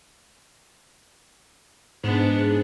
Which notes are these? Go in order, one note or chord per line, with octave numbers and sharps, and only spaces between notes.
G#2 B3 D4